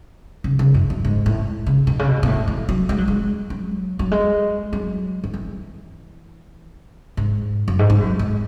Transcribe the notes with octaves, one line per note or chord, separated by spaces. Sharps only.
C#3
C#3
F#2
F#2
G#2
A2
C#3
B2
C#3
B2
B2
A2
E3
F#3
G#3
F#3
G#3
F#3
F#3
G#3
F#3
D#3
E3
G#2
F#2
G#2
G#2
F#2
G#2